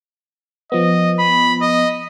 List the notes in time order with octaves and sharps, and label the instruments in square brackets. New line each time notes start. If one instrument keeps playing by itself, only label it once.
[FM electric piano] F3 B3 [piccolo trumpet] D#5
[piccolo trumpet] B5
D#5